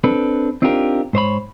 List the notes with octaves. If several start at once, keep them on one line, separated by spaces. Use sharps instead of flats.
C4 D4 A4 B4
C4 D4 D#4 F4 G4 A#4
G#2 C5 C#5 B5